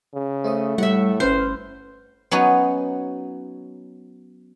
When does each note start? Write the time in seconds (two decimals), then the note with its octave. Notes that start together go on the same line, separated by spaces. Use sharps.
0.15 C#3
0.44 A3 C5 C#5 D#6
0.78 A2 G3 E5 F#5
1.20 G1 C#4 B4 C5 F6
2.31 F#3 B3 C#4 D#4 F#4